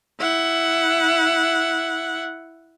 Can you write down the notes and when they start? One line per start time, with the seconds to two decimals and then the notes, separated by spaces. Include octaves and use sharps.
0.20 E4 F#5